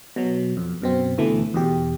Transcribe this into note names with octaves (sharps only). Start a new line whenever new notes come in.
B2 F#3
F2
F#2 B2 C4
D2 B2 E3 A3
E2 B2 G4